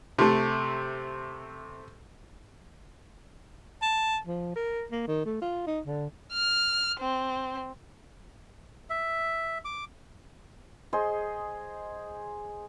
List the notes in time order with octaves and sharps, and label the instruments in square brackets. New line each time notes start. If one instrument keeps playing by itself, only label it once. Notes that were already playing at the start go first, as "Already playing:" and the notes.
[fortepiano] C3 A3
[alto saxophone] A5
F3
A#4
A#3
D#3
A3
F4
D#4
D3
[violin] F6
C4
[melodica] E5
D6
[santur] G#4 C5 D#5 C6